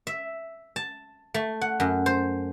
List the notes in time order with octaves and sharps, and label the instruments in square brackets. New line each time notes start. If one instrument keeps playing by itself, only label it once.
[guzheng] E5
A5
A3
F#5
F#2
C5